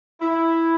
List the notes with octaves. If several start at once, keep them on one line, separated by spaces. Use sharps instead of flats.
E4